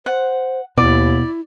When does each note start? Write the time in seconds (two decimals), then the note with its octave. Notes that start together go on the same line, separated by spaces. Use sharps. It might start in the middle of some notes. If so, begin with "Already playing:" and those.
0.06 C5 F#5
0.78 D#2 B2 E4 D5